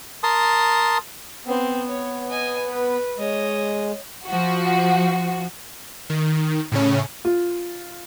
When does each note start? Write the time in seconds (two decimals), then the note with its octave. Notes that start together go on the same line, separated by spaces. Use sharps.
0.23 A#4 A5 C6 D#6
1.47 B3 C4
1.89 C#5
2.30 D#5 G#5
2.67 B4
3.18 G#3 C#5 D#5
4.26 F3 F#4
6.10 D#3
6.72 A2 C#3 C#4
7.25 F4